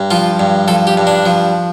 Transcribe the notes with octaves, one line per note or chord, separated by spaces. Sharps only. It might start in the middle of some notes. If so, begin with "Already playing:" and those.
Already playing: G2
F3 F4
G2
F3 A4
G4
G2
D4
F3